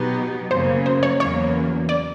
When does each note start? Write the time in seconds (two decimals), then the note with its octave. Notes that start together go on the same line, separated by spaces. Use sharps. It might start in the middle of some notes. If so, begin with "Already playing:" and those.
Already playing: B2 F#3 B3 D#4 G4
0.51 F#2 C#3 F#3 A#3 C5
0.86 C5
1.03 C#5
1.20 E2 C#3 F#3 A#3 C#5
1.89 D5